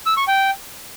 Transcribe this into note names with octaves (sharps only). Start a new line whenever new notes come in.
E6
C#6
G5